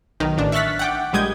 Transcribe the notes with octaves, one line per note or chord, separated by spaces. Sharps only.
B1 D#3 D#4
A1 D4
E5 C#6 F6 F#6 A6 B6
F#5 G5 D6
A#1 G3 G#3 D#6 G6 G#6